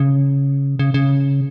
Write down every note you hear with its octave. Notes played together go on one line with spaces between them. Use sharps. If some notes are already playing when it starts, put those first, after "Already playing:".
Already playing: C#3
C#3
C#3